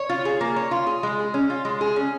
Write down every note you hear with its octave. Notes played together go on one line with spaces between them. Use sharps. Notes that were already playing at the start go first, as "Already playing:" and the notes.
Already playing: C#5
F4
G#4
A#3
C#5
F4
G#4
G#3
G#4
C#4
F4
G#3
G#4
C#4